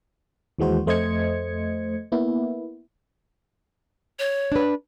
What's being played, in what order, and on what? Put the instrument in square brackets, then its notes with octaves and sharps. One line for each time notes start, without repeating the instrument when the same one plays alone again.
[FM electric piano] D#2 E3 G#3 F#4 C5
F2 A3 C5 D#5 G#6 C#7
A#3 B3 E4
[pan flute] C#5
[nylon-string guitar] D4 B4